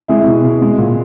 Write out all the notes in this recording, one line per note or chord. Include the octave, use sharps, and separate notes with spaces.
G#3 E4 G#4
B2
B2
G#3
A#2